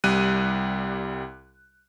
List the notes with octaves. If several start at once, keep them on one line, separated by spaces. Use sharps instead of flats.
C2 G3 F#6 D#7